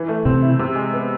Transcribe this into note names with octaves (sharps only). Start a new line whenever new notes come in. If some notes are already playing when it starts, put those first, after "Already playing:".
Already playing: E3
A3
C3 C4
E4
C3
G#3
B3